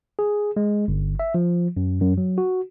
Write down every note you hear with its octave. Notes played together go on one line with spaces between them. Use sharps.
G#4
G#3
G1
E5
F3
F#2
F#2
F#3
F#4